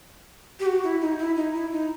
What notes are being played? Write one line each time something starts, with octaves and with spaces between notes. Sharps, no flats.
G4
F#4
E4
D#4
E4
D#4
E4
D#4